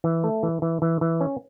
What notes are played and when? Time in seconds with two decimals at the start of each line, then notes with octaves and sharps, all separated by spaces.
0.04 E3
0.24 A3
0.43 E3
0.62 E3
0.82 E3
1.01 E3
1.21 C#4